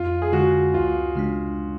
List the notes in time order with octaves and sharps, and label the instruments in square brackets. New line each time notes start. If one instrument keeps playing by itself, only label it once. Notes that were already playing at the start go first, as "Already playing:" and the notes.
Already playing: [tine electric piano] F2 [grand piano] F4
[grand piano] G#4
[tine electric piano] D3 G#3 [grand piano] F#4
[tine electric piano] C#2 [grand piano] F4
[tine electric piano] C#3 G#3 D4